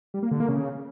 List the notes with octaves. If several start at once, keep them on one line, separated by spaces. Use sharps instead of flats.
G3
A#3
D3
A#3
C#3